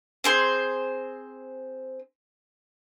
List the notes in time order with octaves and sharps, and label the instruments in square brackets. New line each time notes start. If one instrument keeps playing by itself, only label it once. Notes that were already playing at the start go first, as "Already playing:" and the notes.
[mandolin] C4 G#4 C5